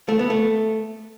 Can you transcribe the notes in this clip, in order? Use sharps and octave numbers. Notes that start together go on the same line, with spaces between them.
A3
B3
A3